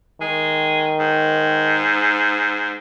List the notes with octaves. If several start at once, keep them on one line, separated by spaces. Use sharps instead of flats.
D#3 G#3
G#2